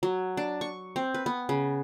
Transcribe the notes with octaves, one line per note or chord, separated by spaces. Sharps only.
F#3
D4
C#6
C4
B4
B3
C#3